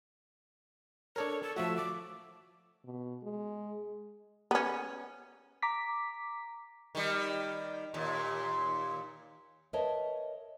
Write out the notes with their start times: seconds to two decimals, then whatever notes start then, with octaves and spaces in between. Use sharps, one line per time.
1.16 D4 A4 A#4 C#5
1.43 A4
1.56 F3 A3 F#4 E5
1.77 D6
2.84 B2
3.23 G#3
4.51 B3 C#4
5.62 A#5 D6 B6
6.95 D#3 G3
7.94 D#2 A#2 C6
9.73 A#4 B4 C#5 D#5 E5 A5